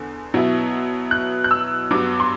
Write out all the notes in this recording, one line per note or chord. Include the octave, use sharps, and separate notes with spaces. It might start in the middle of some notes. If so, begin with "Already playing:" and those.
Already playing: E2 D3
B2 F#3 B3 E4
F#6
F#6
E6
G2 F#3 B3 D6
C6